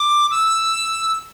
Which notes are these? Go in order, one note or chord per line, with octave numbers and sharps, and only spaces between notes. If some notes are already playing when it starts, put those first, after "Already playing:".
Already playing: D6
E6